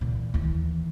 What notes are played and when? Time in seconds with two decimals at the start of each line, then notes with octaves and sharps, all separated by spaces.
0.01 A#2 E3
0.34 D#2 E3